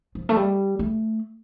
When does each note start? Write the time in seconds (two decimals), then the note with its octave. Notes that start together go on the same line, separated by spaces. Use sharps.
0.15 F3
0.29 A3
0.36 G3
0.79 A3